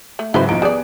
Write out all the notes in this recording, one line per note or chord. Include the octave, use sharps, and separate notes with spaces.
A3
G#2 C#3 F#3 E4 B4 C5
B1 F3 D#4 D7
G3 B3 G#4 D5